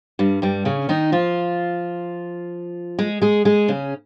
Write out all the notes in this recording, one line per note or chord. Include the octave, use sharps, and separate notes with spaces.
G2 G3
G2 G3
C#3 C#4
D#3 D#4
F3 F4
G#3 G#4
G#3 G#4
G#3 G#4
C#3 C#4